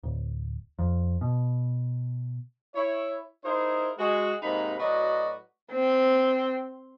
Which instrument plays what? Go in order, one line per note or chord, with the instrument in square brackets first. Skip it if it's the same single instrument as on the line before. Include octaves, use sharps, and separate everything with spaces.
[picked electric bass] D1
F2
B2
[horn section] E4 C#5
D#4 E4 G#4 A#4 C5
G#3 F#4
G#2 C3 A#3 D#4 F#5 B5
A2 F#3 F#4 B4 D5 D#5
[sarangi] C4